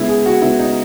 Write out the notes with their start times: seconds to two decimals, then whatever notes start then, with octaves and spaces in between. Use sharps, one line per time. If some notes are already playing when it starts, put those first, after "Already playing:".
Already playing: C#3 G#3 B3 E4
0.08 G#4
0.26 F#4
0.42 C#3 G#3 B3 E4
0.59 D#4